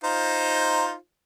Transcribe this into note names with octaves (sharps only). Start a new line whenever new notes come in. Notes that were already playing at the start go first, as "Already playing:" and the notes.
D#4 F4 C5